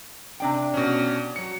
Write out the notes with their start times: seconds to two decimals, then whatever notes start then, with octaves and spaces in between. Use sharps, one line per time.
0.40 C3 D4 G5
0.74 B2 C#4
1.36 F#3 C#7